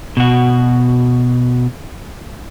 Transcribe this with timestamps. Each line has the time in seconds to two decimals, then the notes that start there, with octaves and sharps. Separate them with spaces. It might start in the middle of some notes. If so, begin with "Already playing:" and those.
0.17 B2 F#4